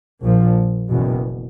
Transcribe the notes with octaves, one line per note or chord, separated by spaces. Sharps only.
A#1 A#2 F3
F#1 E2 B2